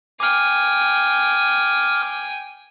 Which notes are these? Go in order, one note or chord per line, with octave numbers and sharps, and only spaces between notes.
G5 G#5 D6 F6